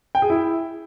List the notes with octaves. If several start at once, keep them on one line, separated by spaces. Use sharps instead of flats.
G5
G#4
E4